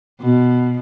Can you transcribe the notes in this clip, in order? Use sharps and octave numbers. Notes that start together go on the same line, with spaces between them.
B2